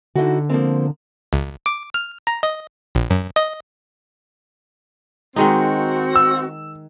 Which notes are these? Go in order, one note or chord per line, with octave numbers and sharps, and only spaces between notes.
D3 D#4 E4 F#4
F3 A#3 C4
C#2
D6
F6
A#5
D#5
A#1
F#2
D#5
D#3 G#3 C4 D#4 F#4
E6